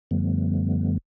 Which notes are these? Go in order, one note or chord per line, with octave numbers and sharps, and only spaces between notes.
F#2 D3 F3 G3 A3 B3